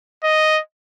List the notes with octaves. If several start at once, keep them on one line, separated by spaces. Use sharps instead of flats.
D#5